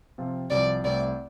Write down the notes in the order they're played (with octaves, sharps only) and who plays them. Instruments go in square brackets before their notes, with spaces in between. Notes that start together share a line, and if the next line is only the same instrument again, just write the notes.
[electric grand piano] C3 F3 C4 F4
[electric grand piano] C2 C3 F3 [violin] D5
[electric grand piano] C2 C3 A3 C4 [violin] D5